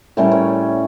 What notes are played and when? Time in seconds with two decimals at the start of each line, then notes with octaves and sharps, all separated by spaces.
0.17 A2 G3 C#4 A#4
0.32 C#5